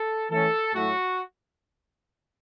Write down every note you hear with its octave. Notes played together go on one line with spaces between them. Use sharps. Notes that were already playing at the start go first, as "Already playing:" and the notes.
Already playing: A4
E3 A3 C#4 A4
A2 F#3 A3 F#4